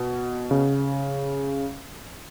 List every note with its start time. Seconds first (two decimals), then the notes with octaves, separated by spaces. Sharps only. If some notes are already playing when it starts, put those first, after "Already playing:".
Already playing: B2
0.51 C#3